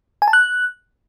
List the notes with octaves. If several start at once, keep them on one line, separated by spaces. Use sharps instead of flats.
G#5
A5
F#6